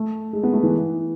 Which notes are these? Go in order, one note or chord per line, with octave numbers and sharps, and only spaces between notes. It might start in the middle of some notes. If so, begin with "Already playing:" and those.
Already playing: A3
G#3
B3
A3
E3